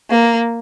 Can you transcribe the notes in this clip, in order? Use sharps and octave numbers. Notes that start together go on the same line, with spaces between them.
A#3